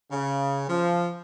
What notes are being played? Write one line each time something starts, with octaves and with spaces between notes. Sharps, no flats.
C#3
F3